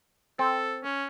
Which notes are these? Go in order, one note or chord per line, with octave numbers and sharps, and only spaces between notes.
C4 A4
C#4